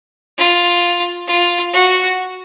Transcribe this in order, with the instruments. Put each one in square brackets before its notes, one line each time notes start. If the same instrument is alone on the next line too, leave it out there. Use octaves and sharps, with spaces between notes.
[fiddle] F4
F4
F#4